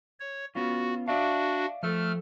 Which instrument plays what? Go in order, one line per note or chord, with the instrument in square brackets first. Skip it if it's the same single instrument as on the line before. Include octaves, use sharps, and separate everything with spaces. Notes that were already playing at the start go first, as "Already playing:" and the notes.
[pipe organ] C#5
[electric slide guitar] B3 C#4 F4 [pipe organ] F#4
[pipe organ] D4 F#4 [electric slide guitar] D5 E5 F5
[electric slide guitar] F3 A4 [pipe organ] A3 F6